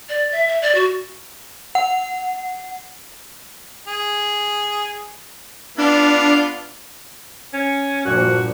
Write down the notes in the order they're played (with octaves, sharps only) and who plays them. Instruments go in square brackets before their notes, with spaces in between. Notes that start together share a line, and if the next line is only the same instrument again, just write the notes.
[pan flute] D5
E5
E5
D5
F#4
[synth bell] F#5
[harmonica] G#4
[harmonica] B3 F4 [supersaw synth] D4
[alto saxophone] C#4
[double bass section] G2 A#2 F3 [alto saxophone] F#4